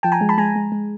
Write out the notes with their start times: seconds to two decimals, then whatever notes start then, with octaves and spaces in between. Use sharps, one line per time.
0.03 F3 G5 A5
0.12 G#5 A#5
0.21 G#3
0.29 A5 B5
0.38 G#3 G#5 A#5
0.56 G#3
0.72 G#3